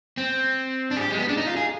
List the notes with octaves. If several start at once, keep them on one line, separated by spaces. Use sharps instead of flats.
C4
D4
G#4
G4
G#3
B3
D4
D#4
F4
G#4